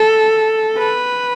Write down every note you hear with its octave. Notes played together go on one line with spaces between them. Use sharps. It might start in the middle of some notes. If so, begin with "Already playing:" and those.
Already playing: A4
B4